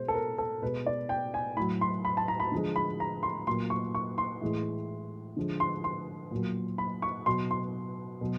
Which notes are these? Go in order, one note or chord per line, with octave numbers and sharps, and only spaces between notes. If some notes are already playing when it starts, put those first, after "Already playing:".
Already playing: B2 G#3 C5
A4
A#4
A4
B2 G#3 B4
D5
G5
G#5
A2 F#3 B5
C6
B5
A5
A#5
B5
D3 F3 G#3
B5
A#5
C6
A#2 F#3 C6
C#6
C#6
C6
A2 E3 G#3
D3 F3 G#3
C6
C6
A#2 F#3
B5
C#6
B2 F#3 C6
C6
B2 F#3